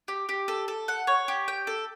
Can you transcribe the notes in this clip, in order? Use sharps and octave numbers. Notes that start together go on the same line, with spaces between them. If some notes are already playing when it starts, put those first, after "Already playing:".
G4
G4
A4
A4
F#5
C#5
G4
G5
A4